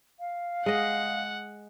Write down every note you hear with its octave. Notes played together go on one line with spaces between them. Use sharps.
F5
G#3 D#5 F#5